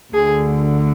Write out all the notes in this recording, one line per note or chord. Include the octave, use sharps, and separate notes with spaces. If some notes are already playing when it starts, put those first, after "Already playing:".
D2 D3 G#4